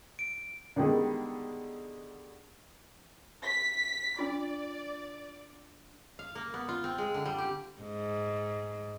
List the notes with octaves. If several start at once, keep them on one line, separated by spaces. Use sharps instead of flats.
D7
D3 D#3 G3 G#3 B3
B6
D4 F4 D5
F5
A#3
B3
F4
C4
G#3
D3
G3
G4
G#2